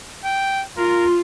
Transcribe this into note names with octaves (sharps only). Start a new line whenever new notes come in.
G5
F4 A#4